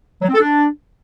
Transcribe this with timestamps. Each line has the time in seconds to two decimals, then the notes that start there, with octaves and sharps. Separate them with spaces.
0.22 F#3
0.28 C4
0.35 A4
0.41 D4